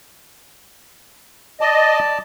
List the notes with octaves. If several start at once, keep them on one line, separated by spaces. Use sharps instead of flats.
D5 D#5 A5